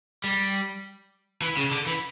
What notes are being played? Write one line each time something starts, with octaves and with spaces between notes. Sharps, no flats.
G3
E3
C#3
D3
E3